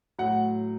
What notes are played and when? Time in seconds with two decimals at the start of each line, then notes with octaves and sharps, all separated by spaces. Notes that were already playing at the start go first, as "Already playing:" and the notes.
0.19 A2 F#3 F#5